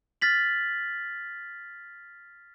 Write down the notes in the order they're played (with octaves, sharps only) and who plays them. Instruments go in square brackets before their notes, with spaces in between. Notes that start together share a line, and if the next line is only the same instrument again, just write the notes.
[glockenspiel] F6 A6 B6 F#7